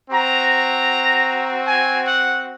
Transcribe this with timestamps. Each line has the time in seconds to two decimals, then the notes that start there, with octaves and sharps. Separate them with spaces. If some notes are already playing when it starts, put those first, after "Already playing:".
0.11 C4 F#4 A#5
1.65 G#5
2.03 F#5